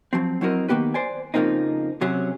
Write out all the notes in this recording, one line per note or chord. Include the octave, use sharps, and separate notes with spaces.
F3 F#3 C4
F#3 C4 E4 F#4 A#4 D#5
D#3 A#3 B3 G4 B4
C5 D5 G#5
F2 C#3 F3 A#3 C4 D#4
C3 F#3 C#4 G#4